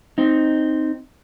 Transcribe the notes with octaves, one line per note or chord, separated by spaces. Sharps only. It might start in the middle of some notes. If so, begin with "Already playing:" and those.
C4 D#4